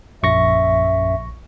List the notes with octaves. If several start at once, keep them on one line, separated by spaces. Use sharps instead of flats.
A#1 F#2 E5 C#6 A#6